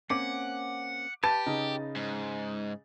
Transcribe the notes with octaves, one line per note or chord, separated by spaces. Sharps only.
A#3 C4 C#4 F#5 D6
G4 B4 A5 A6
C#3 D#4
G#2